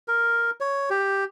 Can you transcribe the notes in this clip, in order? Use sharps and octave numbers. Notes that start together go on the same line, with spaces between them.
A#4
C#5
G4